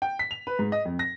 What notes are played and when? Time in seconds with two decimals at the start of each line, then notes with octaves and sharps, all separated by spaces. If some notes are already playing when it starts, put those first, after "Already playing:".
0.02 G5
0.19 B6
0.31 F7
0.47 B4
0.59 G#2
0.72 D#5
0.85 F2
0.99 A#6